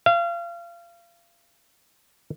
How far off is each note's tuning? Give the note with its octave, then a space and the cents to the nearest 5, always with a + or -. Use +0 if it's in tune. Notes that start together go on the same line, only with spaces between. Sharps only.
F5 -30